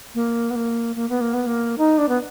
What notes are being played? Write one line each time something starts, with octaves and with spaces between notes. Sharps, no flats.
A#3
B3
A#3
A#3
B3
A#3
B3
A#3
D#4
D4
B3